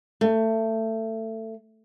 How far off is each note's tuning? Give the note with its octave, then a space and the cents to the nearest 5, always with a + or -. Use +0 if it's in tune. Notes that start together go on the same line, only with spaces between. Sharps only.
A3 +20